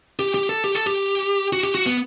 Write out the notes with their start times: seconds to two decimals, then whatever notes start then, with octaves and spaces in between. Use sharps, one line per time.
0.19 G4
0.34 G4
0.49 A4
0.64 G4
0.75 A4
0.86 G4
1.53 F#4
1.64 G4
1.75 F#4
1.86 B3